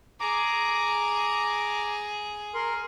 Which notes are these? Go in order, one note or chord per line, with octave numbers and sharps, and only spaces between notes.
G#4 A#5 D6
A#4 C6